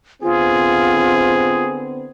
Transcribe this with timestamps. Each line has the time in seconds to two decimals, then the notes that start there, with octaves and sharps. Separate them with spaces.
0.23 D3 B3 C4 F4 G#4